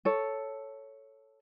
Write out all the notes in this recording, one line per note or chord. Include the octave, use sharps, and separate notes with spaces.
A4 C#5